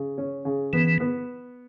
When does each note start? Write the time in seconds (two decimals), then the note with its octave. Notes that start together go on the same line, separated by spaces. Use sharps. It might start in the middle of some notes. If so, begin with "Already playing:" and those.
Already playing: C#3
0.18 C#4
0.45 C#3
0.73 E3 B3
1.00 B3